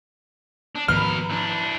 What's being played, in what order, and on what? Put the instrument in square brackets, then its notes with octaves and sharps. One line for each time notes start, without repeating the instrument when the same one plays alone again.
[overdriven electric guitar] D4
[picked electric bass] G#2 D#3 F3 [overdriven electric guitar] B2 A#4 [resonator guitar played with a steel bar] B4 [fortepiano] F6
[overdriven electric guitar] E3 D4